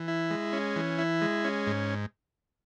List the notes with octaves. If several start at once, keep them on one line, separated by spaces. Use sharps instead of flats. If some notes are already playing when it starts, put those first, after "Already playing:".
Already playing: E3
E4
G#3
C#4
E3
E4
G#3
C#4
G#2